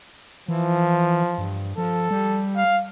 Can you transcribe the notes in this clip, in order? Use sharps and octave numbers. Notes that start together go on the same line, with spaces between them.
E3 F3
G2
F3 A4
G3
F5